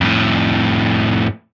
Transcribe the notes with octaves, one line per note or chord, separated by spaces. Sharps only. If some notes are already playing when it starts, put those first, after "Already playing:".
F2 A2